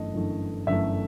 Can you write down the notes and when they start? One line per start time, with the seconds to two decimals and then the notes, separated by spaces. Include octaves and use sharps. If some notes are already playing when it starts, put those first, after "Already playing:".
Already playing: G1 F#2 E3 A3 D#5
0.14 G1 F#2 E3 A3
0.67 G1 F#2 E3 A3 E5